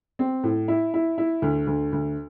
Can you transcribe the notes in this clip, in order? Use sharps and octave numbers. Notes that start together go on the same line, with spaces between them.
C4
A2
E4
E4
E4
D2
D2
D2